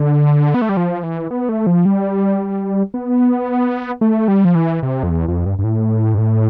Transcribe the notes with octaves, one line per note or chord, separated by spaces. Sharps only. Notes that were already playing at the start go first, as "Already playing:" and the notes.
Already playing: D3
B3
A3
G3
F3
E3
B3
A3
F3
G3
B3
A3
G3
F3
E3
C3
F2
E2
F2
G2
G2
A2
G2
A2